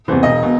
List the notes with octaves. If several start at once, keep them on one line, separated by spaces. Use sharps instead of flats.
E2 C3 E3 C5
E1 D#5
B2